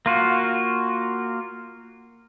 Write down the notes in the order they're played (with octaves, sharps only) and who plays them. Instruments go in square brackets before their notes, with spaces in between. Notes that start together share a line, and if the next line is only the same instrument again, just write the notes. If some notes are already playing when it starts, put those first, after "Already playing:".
[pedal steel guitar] A#3 F4 F#4